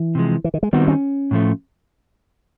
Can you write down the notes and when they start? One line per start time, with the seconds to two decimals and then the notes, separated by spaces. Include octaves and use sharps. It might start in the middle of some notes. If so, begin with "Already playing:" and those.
Already playing: E3
0.15 C3 F3 G#3
0.44 E3
0.54 D#3
0.63 G#3
0.73 D#3 G3 B3 C4 D#4 F#4
0.88 C#4
1.31 A2 F3 A3